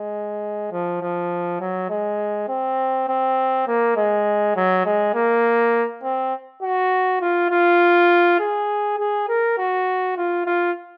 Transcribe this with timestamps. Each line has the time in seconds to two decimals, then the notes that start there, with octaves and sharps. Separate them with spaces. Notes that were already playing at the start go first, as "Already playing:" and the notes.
Already playing: G#3
0.72 F3
1.01 F3
1.60 F#3
1.90 G#3
2.49 C4
3.08 C4
3.67 A#3
3.97 G#3
4.56 F#3
4.85 G#3
5.15 A#3
6.03 C4
6.62 F#4
7.21 F4
7.51 F4
8.40 G#4
8.98 G#4
9.28 A#4
9.58 F#4
10.17 F4
10.46 F4